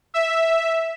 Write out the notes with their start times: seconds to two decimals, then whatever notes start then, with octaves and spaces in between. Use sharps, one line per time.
0.14 E5